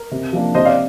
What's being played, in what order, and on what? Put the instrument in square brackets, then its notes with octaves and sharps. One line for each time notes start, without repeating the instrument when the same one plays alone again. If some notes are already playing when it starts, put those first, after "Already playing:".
Already playing: [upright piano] A#4
[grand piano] C3
F3 A#3 D4
[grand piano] C3 [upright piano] C5 D#5
[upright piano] D5 F5